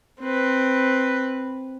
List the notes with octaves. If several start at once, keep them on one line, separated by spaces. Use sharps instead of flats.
C4 B4